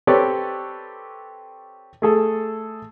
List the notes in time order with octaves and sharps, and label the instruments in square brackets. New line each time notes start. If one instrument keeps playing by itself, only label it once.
[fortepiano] C4 G4 A4 B4 C#5 D5
A3 G#4 A4